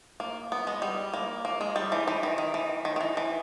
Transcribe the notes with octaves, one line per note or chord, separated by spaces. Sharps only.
A#3
B3
G#3
G3
A#3
A#3
G#3
G3
E3
E3
D#3
D#3
E3
D#3
D#3
E3
E3